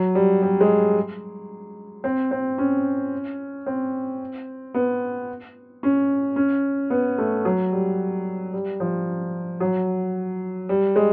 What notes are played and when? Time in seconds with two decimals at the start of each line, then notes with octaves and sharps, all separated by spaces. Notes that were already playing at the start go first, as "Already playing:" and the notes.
Already playing: F#3
0.15 G3
0.42 G3
0.61 G#3
2.04 C4
2.31 C4
2.58 C#4
3.66 C4
4.74 B3
5.83 C#4
6.36 C#4
6.90 B3
7.18 A3
7.45 F#3
7.72 G3
8.53 G3
8.80 F3
9.60 F#3
10.69 G3
10.96 G#3